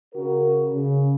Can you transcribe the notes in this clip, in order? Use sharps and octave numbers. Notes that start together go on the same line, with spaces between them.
C#3 F#4 A#4
C#3